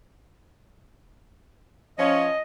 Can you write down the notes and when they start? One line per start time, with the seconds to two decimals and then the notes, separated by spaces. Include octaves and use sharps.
1.98 F3 C#4 D#5